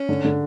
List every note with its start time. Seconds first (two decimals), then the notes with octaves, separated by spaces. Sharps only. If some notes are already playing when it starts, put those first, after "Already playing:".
Already playing: C#4
0.09 D3
0.24 D3